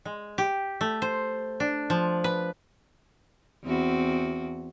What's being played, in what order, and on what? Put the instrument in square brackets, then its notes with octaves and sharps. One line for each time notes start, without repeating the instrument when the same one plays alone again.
[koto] G#3
G4
A3
C5
D4
F3
B4
[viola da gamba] E2 C4 F#4